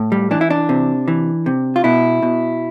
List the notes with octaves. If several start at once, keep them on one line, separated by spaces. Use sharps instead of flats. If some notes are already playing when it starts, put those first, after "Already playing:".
Already playing: A2
G3
E3 D4
E4
D4
C3
E3
C3
F4
B2 E4
B2